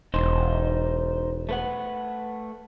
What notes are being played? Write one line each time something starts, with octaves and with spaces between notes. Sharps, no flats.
E1 D#4 C5
A3 B4 F#5